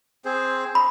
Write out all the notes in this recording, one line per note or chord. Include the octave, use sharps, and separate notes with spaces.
C4 G#4 C5
B5